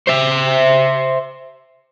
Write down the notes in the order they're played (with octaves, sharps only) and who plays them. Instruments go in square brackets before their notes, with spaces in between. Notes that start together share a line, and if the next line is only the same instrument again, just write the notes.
[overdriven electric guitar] C5 E5